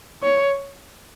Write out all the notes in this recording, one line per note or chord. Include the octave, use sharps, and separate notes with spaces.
C#5